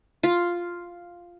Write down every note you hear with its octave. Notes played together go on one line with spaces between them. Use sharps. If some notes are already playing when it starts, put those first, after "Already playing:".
F4